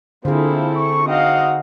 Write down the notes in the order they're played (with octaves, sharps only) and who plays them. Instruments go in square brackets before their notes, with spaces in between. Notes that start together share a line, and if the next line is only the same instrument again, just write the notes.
[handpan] D3 G#4 [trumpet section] A#3 F4 C5 [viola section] C4 E4 A4
[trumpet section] C#6
[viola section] C4 D#5 F5 [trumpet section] D#4 F#4 F#5